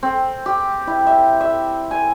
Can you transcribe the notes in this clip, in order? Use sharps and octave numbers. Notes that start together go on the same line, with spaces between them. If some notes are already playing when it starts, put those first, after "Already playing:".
C4
G4
E4
E5
E5
G#5